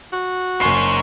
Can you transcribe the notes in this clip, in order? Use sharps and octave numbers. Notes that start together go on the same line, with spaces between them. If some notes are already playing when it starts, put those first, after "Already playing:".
F#4
F#1 D#4 C5 G#5 C#6 C7